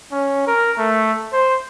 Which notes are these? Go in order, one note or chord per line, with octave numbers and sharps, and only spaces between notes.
C#4
A#4
A3
C5